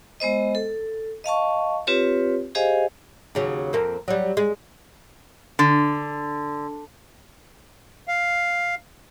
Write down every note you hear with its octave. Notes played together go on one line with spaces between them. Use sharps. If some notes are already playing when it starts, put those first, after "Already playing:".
G#3 B3 C5 D#5
A4
D#5 F5 A5 C#6
C4 F4 G4 B4 C#5
G4 G#4 C5 D#5 F5 G#5
D#2 C#3 F#3
F2 A#3 C4
F#3 G3
G#3
D3
F5